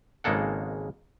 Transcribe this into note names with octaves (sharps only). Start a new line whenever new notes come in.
G#1 C#3 G#3 A#3 A4 F#5